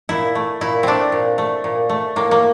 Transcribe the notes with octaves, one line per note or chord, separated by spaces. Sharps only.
A#2 E4
A3
A#2 E4
A3 C4 D4
A#2
A3
A#2
A3
A2 A#3
A#3